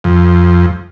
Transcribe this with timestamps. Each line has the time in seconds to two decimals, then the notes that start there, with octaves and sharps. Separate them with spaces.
0.04 F2